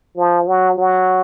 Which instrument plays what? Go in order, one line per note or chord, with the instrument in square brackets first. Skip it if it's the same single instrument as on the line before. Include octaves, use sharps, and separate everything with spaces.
[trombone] F3
F#3
F#3